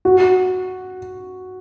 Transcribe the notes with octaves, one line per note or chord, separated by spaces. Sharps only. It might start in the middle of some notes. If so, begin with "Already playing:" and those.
F#4